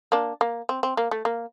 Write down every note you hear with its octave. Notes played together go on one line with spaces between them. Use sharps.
A#3 D4
A#3
C4
C4
A#3
A3
A#3